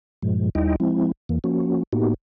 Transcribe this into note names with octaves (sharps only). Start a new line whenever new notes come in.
G2 A#2 F3 G#3
D#2 G3 D#4 E4 D#5 G5
F3 G#3 C4 E4
E2 E3 A#3
F3 A#3 C#4 F#4
A2 A#3 B3 D#4 F#4 G4